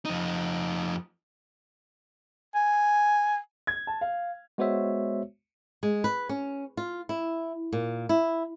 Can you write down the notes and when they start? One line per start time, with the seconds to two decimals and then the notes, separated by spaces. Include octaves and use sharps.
0.05 F2 D#4
2.55 G#5
3.67 G#6
3.87 A5
4.01 F5
4.58 G#3 B3 F#4 C5 C#5 E5
5.83 G#3
6.04 B4
6.29 C#4
6.77 F4
7.09 E4
7.73 A#2
8.09 E4